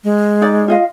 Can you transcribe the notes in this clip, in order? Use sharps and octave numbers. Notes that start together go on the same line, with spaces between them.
G#3
D#4 D5
F4 D#5 F5